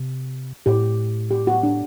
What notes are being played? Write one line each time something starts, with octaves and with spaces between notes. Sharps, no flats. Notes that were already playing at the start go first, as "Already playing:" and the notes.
Already playing: C3
A2 G4
G4
F#4
D4